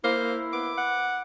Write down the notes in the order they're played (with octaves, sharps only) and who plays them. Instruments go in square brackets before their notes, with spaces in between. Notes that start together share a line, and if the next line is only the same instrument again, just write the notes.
[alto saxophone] A#3 [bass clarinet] E4 [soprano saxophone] C5
[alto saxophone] B3 [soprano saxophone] D6
[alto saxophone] F#5